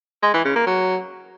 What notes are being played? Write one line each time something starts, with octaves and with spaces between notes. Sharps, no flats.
G#3
E3
C#3
A#3
F#3